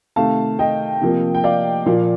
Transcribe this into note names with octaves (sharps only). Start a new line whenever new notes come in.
C3 D#3 A3 F5 A5
D#5 G5
C3 F3 A#3
G5
D5 F5
A#2 F3 A#3